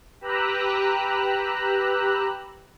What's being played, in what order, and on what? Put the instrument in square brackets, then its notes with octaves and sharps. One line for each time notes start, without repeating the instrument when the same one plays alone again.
[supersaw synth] G4 B4 A#5 E6 F#6